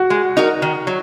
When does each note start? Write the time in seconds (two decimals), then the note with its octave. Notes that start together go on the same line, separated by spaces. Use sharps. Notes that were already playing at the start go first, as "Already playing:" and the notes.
Already playing: F#4
0.10 G#3
0.37 D#4 F#4 A#4
0.62 D#3
0.87 F#3